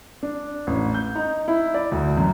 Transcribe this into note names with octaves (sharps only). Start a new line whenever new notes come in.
D4
A1
G6
D#4
E4
D5
D2
F#2